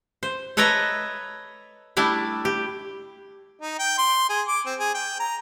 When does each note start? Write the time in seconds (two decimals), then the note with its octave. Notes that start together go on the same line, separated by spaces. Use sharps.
0.23 C5
0.57 A4 B4 C#5 D#5 E5 A#5
1.97 G3 A3 D4 E4
2.45 G4
3.61 D#4
3.79 G5
3.98 C6
4.30 G#4
4.48 D6
4.66 C4
4.79 G#4
4.94 G5
5.20 A#5